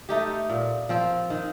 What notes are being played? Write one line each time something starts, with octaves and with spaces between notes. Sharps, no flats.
A3 D#4 G4
A#2
F3 C4
D#3